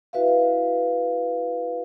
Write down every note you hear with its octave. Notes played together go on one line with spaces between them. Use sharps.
E4 F#4 B4 E5 F5